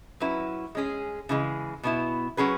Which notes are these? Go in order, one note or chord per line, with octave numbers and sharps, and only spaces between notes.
F#3 C#4 E4 B4
G#3 C#4 G#4
C#3 E3 G#3
B2 B3 E4
F#3 C#4 G#4 B4